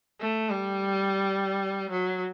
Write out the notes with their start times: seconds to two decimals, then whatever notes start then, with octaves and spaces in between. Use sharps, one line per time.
0.21 A3
0.50 G3
1.91 F#3